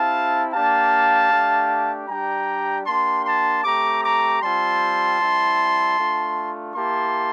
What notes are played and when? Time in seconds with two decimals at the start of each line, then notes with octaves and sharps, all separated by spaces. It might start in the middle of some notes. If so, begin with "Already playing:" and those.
Already playing: C4 E4 G4 F5 A5
0.53 A#3 D4 G4 F5 A5
1.30 A3 D4 G4
2.09 G3 D4 G4 G5 A#5
2.86 A#3 D4 G4 A5 C6
3.25 A5 C6
3.64 A3 C4 G4 A#5 D6
4.03 A#5 D6
4.42 G3 C4 F4 A5 C6
5.20 G3 C4 E4
5.98 A3 D4 F4
6.75 A#3 E4 G4 A5 C6